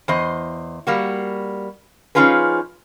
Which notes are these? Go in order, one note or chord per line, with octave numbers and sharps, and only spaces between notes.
E2 C5 D#5
G3 A#3 F#4
F3 C#4 D#4 F4 G#4 B4